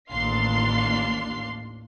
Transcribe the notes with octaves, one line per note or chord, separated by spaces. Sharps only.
A1 D#2 D4 F5 C6 C7